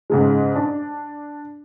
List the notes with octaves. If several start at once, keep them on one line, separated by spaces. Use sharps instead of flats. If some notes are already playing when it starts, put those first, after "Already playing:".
G#2 C#3 G#3
D4